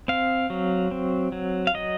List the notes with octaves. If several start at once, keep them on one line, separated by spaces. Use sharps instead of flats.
C4 F5
F#3
C4
F#3
F5
F#3 D#5